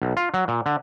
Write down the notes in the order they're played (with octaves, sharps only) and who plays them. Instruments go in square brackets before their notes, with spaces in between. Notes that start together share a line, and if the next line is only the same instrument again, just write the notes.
[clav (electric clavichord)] B1
F4
F#3
A#2
D3